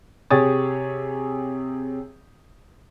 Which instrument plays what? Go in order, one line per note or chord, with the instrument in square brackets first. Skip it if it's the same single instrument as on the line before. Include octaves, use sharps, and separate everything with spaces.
[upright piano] C3 G4 G#4 C#5 D#6 A6